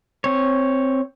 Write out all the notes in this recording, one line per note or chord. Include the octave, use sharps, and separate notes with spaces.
C4 C#5